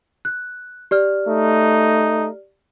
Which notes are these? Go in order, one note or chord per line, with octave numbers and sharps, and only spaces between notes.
F#6
G4 D5 F6
A3 D#4